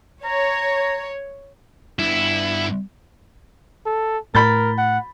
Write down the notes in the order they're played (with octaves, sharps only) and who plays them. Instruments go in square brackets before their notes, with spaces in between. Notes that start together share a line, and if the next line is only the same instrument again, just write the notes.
[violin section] C#5 [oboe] A#5
[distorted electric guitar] G2 B3 [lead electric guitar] E4
[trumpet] A4
[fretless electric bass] A2 [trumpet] A#4 [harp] B5 G6 A6
[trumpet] F#5